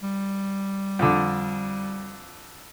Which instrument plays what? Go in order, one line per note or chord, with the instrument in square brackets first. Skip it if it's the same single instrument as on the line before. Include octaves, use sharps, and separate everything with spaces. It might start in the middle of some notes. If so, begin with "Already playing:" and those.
[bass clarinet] G3
[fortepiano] F2 D3